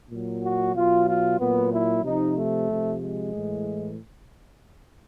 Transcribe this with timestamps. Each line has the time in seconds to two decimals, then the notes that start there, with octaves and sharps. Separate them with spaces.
0.11 A#2 F#3
0.43 F#4
0.75 B2 F#3 F4
1.07 F4
1.40 A#2 F#3 B3
1.73 E4
2.04 C3 F3 D#4
2.37 A3
2.69 C3 F3
3.02 G#3
3.34 A2 E3